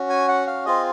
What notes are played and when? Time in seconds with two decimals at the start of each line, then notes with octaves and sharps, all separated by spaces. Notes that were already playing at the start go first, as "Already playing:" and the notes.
Already playing: C#4 F#4
0.10 G#5
0.28 F#5
0.47 F5
0.66 C4 F4 G#4 D#5